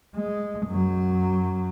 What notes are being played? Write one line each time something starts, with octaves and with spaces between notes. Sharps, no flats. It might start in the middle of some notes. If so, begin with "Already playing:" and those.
G#3
F#2 F#3